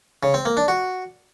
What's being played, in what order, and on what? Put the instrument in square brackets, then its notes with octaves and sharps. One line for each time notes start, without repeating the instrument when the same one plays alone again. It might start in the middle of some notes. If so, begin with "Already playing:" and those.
[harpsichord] C#3
C4
A#3
D4
F#4